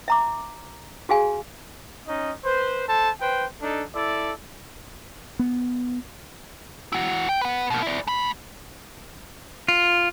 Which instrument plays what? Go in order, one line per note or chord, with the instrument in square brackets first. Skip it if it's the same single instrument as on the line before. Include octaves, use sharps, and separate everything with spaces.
[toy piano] E5 A#5 D6
F#4 G#4 F5 G#5
[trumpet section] C#4 D#4 D#5
B4 C5
A4 C5 A5
B4 C5 G5
D4 D#4 A4
E4 A4 D5
[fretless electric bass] B3
[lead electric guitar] E4 F#4
G5
B4 F#5
B2 A#3
E4 D5
A3 B5
[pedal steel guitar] F4